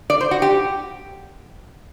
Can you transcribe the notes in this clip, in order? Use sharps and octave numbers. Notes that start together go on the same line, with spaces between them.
D5
C5
F#4
G4